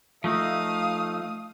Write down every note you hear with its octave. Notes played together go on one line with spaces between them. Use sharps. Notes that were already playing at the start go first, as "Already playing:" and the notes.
F3 A3 D#4 F5 D#6